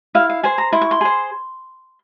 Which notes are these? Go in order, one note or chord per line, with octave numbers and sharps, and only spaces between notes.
E4 F5
F5
G#4 C5 G#5
A#5
E4 C6
C#6
C6
G#4 C5